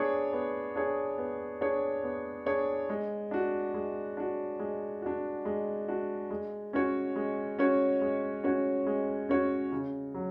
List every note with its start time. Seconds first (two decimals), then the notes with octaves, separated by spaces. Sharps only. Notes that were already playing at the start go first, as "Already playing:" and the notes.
Already playing: B3 D4 G#4 C#5
0.33 B3
0.75 D4 G#4 C#5
1.18 B3
1.61 D4 G#4 C#5
2.03 B3
2.46 D4 G#4 C#5
2.89 G#3
3.31 D4 F#4
3.74 G#3
4.17 D4 F#4
4.59 G#3
5.02 D4 F#4
5.45 G#3
5.88 D4 F#4
6.30 G#3
6.73 C#4 F#4 C#5
7.16 G#3
7.59 C#4 F#4 C#5
8.01 G#3
8.44 C#4 F#4 C#5
8.86 G#3
9.29 C#4 F#4 C#5
9.72 C#3
10.14 F#3